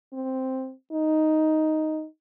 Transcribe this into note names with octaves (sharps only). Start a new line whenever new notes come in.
C4
D#4